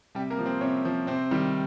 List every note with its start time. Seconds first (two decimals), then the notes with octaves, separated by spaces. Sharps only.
0.15 C3 G3 G4
0.30 A#3 A#4
0.39 F3
0.46 C4 C5
0.61 C3 C#4 C#5
0.85 F3
1.07 C3 C4 C5
1.31 D#3 G3